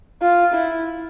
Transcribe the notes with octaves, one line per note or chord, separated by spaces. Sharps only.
F4
E4